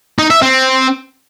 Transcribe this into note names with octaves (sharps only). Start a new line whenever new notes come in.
D#4
E5
C4